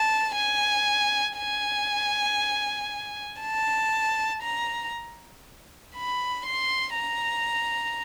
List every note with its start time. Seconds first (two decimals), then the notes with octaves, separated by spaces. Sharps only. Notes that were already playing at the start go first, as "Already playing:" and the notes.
Already playing: A5
0.35 G#5
1.37 G#5
3.41 A5
4.42 A#5
5.95 B5
6.46 C6
6.96 A#5